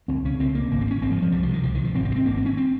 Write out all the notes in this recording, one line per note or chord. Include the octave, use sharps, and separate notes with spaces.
C#2 C4
C#3 C#4
C#2 C4
C#3 A#3
G#1 A#3
C4
G2
C#4
G#1 C4
F3
G2
F3
C2 G3
F3
C3
D#3
C2 F3
D#3
C3 F3
G#1 C4
C4
G2
C4
G#1 A#3
C4
G2
C#4
C4